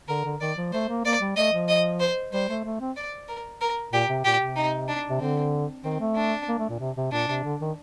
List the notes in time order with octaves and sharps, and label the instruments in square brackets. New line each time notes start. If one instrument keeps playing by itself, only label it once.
[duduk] D3 [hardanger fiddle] A#4
[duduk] D3
[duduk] D#3 [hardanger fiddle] D5
[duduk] F3
[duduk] A3 [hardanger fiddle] C5
[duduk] A#3
[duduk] A#3 [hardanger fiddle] D5
[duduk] G3
[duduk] A3 [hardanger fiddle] D#5
[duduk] F3
[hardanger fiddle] D#5
C5
[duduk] G3 [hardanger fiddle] C5
[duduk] A3
A3
C4
[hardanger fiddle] D5
A#4
A#4
[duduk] A#2 [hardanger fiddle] G4
[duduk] C3
[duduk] A#2 [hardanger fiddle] G4
[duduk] C3
[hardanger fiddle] D#4
D4
[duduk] C3
[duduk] D3 [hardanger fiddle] C4
[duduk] D#3 [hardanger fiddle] C4
[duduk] A3
[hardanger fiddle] D4
[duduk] A#3
A3
A#2
C3
C3
[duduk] A#2 [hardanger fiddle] D4
[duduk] C3
D3
D#3